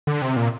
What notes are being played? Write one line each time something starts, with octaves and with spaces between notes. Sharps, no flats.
D3
C3
A#2